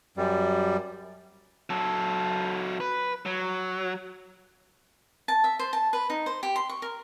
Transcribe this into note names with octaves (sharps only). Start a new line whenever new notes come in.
F#2 G3
F#3 A4
B4
F#3
A5
E5
C5
A5
B4
D#4
C5
G4
C6
C#6
A#4